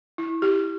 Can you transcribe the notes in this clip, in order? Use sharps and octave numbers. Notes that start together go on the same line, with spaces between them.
E4
G4